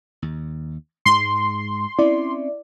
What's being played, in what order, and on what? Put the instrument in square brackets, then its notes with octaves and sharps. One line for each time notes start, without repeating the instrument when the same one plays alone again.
[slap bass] D#2
[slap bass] G#2 G#3 [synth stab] C6
[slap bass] C4 C#4 [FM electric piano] E4 D5